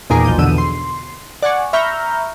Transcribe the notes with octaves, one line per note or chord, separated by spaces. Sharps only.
E2 A#2 D#3 G#4 A#5 D6
B1 F3 G6 D#7
E2 B2 D3 E6 D#7
C6
D5 F#5 G#5 C#6
E5 A#5 B5 C#6 F6 G6